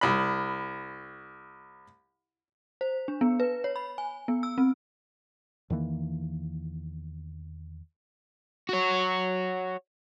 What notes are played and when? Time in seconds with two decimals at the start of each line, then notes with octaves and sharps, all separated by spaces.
0.01 C2 B5
2.81 C5
3.08 D4
3.21 B3
3.40 B4
3.64 C#5
3.76 B5
3.98 G#5
4.28 B3
4.43 E6
4.58 C4
5.70 E2 D#3 E3 A#3
8.69 F#4 C#5